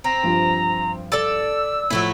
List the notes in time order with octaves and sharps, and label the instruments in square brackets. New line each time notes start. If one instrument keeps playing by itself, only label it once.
[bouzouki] C4 [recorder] A#5
[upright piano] G2 F3
[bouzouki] A4 D5 A5 [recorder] E6
[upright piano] A2 F3 [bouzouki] F#3 A3 E4